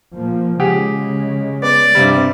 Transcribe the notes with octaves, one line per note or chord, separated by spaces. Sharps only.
A#2 F3 A#3
C#3 G#3 G4 G#4 F#5
B3 D5
G2 C3 G3 C4